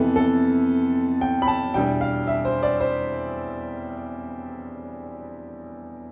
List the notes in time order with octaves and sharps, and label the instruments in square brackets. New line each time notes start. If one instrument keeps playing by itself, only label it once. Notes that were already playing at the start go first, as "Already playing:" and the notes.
Already playing: [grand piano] F2 C3 E3 B3 A4
A4
G5
B5
A5
E2 B2 G3 D4 G5
F5
E5
C5
D5
C5